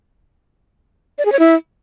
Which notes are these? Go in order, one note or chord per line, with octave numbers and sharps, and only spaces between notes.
D5
G#4
C#5
E4